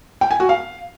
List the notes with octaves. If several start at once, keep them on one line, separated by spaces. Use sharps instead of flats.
G5
G#5
F#4
F5